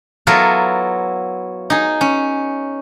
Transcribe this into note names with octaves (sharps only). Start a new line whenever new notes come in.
F#3 B3 E4 F4 A4 A#4
D#4 G#4
C#4